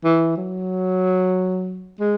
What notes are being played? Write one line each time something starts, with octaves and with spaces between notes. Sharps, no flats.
E3
F#3
G#3